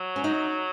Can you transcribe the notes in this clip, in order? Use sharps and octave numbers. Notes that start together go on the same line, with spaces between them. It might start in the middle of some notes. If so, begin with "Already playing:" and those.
Already playing: F#3
C#4
D#4